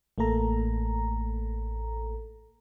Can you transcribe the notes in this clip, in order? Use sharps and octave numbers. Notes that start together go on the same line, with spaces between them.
A1 A3 A#3 A4 A#5